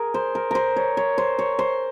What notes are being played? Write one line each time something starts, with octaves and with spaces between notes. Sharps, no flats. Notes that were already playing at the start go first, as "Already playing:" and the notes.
Already playing: G#4 A#4
C5
A#4
A#4 C5
C#5
C#5
C5
C#5
C5